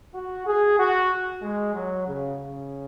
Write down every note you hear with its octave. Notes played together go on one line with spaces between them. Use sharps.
F#4
G#4
F#4
G#3
F#3
C#3
C#3